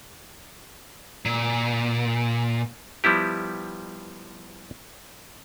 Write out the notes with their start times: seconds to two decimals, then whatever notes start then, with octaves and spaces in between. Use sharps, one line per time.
1.26 A#2
3.04 F3 G3 B3 E4 G4